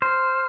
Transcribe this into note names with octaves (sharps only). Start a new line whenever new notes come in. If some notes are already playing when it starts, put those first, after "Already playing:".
C5 F6